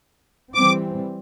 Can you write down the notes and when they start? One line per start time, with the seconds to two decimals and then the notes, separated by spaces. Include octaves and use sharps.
0.55 E3 G3 C4 D6